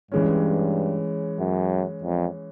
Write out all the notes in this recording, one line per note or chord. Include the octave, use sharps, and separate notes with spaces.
G2 E3 G#3 C#4
F#2
F2